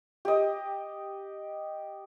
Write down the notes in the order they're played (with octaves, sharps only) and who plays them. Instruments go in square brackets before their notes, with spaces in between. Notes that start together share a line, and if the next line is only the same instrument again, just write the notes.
[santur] G4 D#5